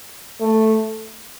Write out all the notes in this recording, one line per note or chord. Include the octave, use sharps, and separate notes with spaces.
A3